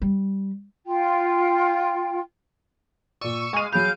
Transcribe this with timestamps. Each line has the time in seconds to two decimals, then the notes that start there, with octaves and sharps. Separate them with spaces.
0.02 G3
0.85 F4 G5
3.21 A#2 D5 C#6 E6 D#7
3.53 G#3 F5 C#6 D#7
3.72 F#3 G#4 F5 B5 G6 D7